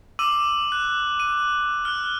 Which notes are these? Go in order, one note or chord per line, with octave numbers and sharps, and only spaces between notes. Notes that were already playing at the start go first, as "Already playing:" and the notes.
D6 E6 D#7 F#7
F#6
D#7
F6 F#6